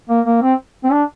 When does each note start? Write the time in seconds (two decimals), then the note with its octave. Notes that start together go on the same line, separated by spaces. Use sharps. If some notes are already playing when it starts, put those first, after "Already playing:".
0.10 A#3
0.26 A#3
0.43 C4
0.84 C4
0.92 D4